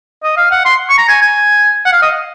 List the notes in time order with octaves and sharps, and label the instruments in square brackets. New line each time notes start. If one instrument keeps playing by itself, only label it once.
[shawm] D#5
F5
F#5
C6
C#6
A#5
G#5
G#5
F#5
F5
D#5